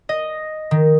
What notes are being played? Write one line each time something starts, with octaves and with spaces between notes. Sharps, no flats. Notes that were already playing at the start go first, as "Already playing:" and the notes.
D#5
D#3